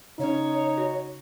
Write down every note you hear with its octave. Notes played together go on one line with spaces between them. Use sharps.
C#3 C#4 D#4 C#5
F#4